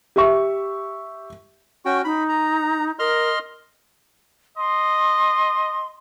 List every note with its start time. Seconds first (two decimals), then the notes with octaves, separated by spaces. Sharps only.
0.16 G4 E5 C#6
1.85 C#4 F#4 G5 C#6
2.04 D#4 B5
2.29 A#5
2.99 A#4 D#5 C6 F6
4.58 D#5 C6